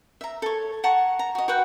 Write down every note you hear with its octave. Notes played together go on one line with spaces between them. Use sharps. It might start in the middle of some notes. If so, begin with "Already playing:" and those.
E5 A#5
A4 C#5
F#5 A5 A#5 C#6
A#5
F#4 D#5
F#4 B4 F#5 G5